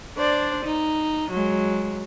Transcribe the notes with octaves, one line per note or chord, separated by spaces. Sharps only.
D4 C5 D5
D#4
F#3 G#3